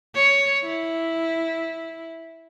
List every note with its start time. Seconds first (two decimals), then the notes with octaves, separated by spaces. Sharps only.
0.15 C#5
0.64 E4